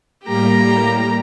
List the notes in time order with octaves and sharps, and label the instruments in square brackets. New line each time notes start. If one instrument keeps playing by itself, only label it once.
[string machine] A2 G3 A#3 [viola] G4 A#5